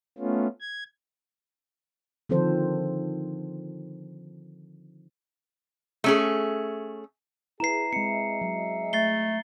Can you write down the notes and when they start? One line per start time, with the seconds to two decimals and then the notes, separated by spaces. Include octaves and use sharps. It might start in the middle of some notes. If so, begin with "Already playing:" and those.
0.18 A3 B3 C#4 F4
0.61 G#6
2.29 D3 D#3 F3 C4 A4 C5
6.04 A3 C#4 G#4
7.60 E4 G#4 B4 A#5 C7
7.93 G#3 C4 G#4 D#5 E5 C#7
8.41 F#3
8.93 A3 A6 C7 G7